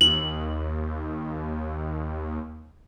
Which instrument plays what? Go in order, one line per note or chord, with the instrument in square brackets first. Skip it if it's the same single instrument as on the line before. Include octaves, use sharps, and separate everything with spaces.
[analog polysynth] D#2 [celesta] F#7